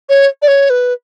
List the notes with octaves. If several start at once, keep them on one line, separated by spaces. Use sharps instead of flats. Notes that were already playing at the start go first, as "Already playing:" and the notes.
C#5
D5
C#5
B4